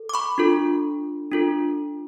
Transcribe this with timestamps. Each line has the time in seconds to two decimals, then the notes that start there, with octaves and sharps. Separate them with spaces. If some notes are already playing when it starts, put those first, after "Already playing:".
Already playing: A4
0.09 D6
0.14 B5 C#6
0.38 D4 F4 A4
1.32 D4 F4 A4